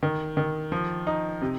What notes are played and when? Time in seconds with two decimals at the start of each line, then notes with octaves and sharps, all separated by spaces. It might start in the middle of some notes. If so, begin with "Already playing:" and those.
0.03 D#3
0.37 D#3
0.72 F3
1.07 D#4
1.42 C3